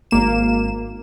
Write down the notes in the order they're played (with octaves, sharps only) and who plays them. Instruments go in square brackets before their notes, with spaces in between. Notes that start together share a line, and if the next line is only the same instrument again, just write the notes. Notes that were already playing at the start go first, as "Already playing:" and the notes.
[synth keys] G#1 A#3 E7